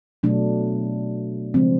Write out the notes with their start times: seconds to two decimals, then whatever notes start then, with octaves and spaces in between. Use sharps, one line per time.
0.23 B2 F#3 A3 D4
1.54 C#3 F3 G#3 C4